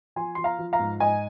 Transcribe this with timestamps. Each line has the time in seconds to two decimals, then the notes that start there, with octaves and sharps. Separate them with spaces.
0.16 F3 G#5 C6
0.35 F3 C6
0.44 F5 A#5
0.59 F3
0.73 F5 A#5
0.79 G#2
1.00 G#2 D#5 G#5